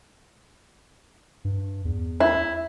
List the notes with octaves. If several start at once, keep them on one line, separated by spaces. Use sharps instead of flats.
G2
E2
E4